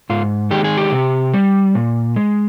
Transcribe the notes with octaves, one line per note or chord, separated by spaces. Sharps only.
G#2 F4
D#3 G#3 G4
G#4
G4
C3
G3
A#2
G#3